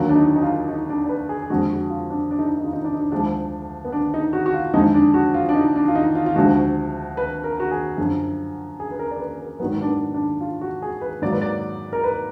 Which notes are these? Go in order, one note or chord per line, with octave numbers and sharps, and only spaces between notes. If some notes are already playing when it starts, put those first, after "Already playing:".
Already playing: D#2 D3 F#3 A#3
D4
D#4
D#4
F4
D#4
D4
D5
B4
G#4
G#4
F2 D3 G#3 F#4
F#4
F4
D4
D4
D#4
D4
D#4
F4
D#4
D4
D#4
D4
D2 D3 F3 G#3 D4
B3
D4
D#4
F#4
F#4
F4
F2 D3 G#3 D#4
D4
F#4
F4
D4
D#4
D4
F4
D#4
F4
F4
D2 D3 F3 G#3 F#4
B4
A#4
F#4
G#4
F#2 D3 F3
G#4
B4
A#4
D5
B4
A#4
G#2 D#3 F#3 B3
D4
B3
D4
F4
F#4
G#4
B4
G#2 F#3 A#3 D5
B4
D5
A#4
B4